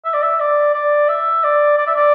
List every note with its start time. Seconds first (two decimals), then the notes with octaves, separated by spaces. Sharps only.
0.05 E5
0.14 D5
0.22 E5
0.40 D5
0.74 D5
1.09 E5
1.44 D5
1.78 D5
1.87 E5
1.95 D5